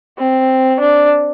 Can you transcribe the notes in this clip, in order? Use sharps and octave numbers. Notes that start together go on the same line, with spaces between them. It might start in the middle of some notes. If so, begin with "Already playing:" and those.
C4
D4